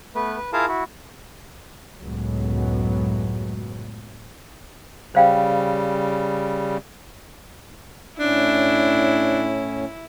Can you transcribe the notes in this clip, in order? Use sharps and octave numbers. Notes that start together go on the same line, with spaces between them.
A3 B3 B4
B4
E4 F4 G#4 A#4 F5 A5
E4 F#4
C#2 F#2 A2 F#3 G#3 B3
C#3 G3 C5 F5 G5
A2 C#4 D4 E4